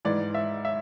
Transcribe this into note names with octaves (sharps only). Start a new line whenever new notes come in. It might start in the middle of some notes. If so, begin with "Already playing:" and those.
G#2 E3 D5
E5
E5